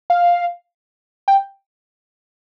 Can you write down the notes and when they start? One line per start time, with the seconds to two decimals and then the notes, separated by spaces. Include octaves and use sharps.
0.10 F5
1.28 G5